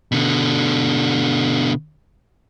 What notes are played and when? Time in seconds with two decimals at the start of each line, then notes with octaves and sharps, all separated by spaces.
0.12 B2 D3